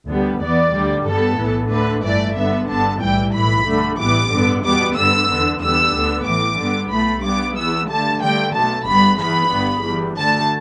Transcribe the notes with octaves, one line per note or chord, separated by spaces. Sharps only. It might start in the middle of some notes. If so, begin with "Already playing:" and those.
D2 D3 G3 B3
E2 E3 B3 D5
D2 D3 G3
G2 G3 B3 A4
B1 A2 E3 B3
D2 D3 A3 B4
G1 G2 E3 A3 D5
G2 D3 B3 E5
G1 G2 D3 B3 A5
B1 A2 E3 G3 G5
B1 A2 E3 B5
G2 D3 A3
A1 A2 E3 G3 B3 D6
G2 D3 B3
E2 B2 G3 B3 D6
G2 D3 B3 E6
E2 D3 B3
E2 D3 G3 B3 E6
D2 D3 B3
A1 A2 E3 D6
G2 D3 G3 B3
B1 A2 A3 B5
G2 G3 B3 D6
E2 E3 B3 E6
G2 D3 A3 A5
G2 D3 A3 G5
B1 B2 A3 A5
G1 G2 G3 B3 B5
E2 E3 B3 B5
G1 G2 G3 B3
E2 E3 G3
D2 D3 A3 A5